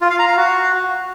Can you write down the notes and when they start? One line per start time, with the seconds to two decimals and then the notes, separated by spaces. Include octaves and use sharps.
0.01 F4
0.10 F5
0.19 A#5
0.28 F5
0.37 F#4